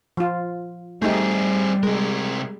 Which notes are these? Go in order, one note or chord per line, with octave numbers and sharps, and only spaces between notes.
F3 F4
G3 A3 C4 D#4 G4 G#4
C3 G#3 A#4